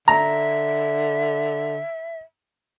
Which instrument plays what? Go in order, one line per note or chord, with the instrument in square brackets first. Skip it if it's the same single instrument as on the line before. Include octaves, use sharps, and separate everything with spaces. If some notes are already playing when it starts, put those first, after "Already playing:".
[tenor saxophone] D3 [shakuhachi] E5 [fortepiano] A#5